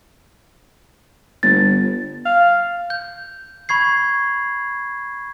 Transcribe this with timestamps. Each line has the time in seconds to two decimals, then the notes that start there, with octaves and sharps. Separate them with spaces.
1.43 G1 A6
2.25 F5
2.90 G6
3.69 B5 C#6 G#6 C7